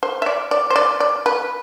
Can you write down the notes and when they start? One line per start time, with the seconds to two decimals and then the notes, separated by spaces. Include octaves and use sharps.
0.03 C5
0.22 E5
0.26 D5
0.51 D5
0.70 C5
0.76 D5
1.00 D5
1.26 B4